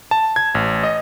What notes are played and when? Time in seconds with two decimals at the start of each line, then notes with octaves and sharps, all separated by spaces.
0.11 A5
0.36 G#6
0.55 A1
0.84 D#5